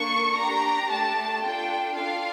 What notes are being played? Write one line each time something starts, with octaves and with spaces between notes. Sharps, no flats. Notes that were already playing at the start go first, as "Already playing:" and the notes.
Already playing: A#3 D4 A4 C#6
D4 G4 A#5
A3 D4 G4 A5
D4 F4 A4 G5
D4 F4 A4 F5